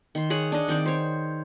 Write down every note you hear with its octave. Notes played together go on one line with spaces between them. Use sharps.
D#3 C6
G#4 C#5 F#5
D4 D#5
D#3 C4 C5 D5
C5 C#5